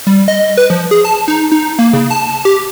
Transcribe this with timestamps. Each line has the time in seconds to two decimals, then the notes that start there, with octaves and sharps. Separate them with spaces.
0.07 G3
0.28 D#5
0.57 B4
0.70 F3
0.91 G#4
1.05 A5
1.28 D#4
1.52 D#4
1.79 A#3
1.93 C#3
2.11 A5
2.45 G4